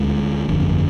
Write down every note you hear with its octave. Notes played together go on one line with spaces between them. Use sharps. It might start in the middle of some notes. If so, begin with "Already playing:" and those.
Already playing: D2 D3 G#3
G1 F2 D3